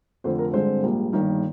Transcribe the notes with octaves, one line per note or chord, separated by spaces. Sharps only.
F1 F2 D3 C5
A#4
G#1 G2 D3 G#3 C4 C5
A#1 G#2 G3 A#3
G1 G2 D#3 A#3